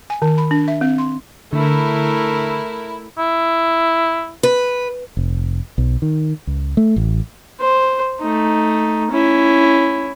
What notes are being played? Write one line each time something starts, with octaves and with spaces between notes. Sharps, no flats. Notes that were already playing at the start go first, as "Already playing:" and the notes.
G#5
D#3
B5
D4
E5
C4
C6
D3 A3 E4 A#4
E4
B4
F1
B1
D#3
C#2
A3
A1
C5
A3 D#4
C#4 E4